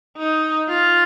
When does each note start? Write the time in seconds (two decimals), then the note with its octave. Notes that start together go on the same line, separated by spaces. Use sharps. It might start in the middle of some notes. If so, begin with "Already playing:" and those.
0.17 D#4
0.68 F4